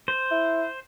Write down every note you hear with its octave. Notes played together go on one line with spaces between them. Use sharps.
C5
E4